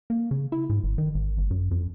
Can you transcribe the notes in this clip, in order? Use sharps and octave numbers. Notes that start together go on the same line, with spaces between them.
A#3
C#3
E4
G#2
G1
D#3
G#1
G1
F#2
F2